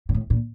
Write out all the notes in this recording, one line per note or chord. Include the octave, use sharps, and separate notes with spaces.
A#2
A2
A#2